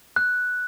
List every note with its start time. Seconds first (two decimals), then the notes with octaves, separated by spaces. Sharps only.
0.16 F#6